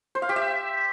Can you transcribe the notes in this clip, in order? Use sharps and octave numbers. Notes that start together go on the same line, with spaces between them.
C5
F5
G4
E5